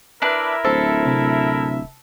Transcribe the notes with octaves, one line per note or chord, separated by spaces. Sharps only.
D4 E4 A#4 B4 E5
D1 A4 C5
C3